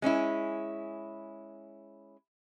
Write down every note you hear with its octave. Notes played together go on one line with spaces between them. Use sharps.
G#3 C#4 D#4 E4